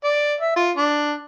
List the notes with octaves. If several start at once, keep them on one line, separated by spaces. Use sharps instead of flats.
D5
E5
F4
D4